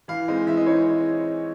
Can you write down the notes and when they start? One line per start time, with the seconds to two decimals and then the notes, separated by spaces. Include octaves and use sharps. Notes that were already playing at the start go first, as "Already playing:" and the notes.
0.08 E3 F5
0.28 G#3 C4 D#4
0.46 E3 E5
0.57 D#5
0.66 G#3 C4 D#4 C#5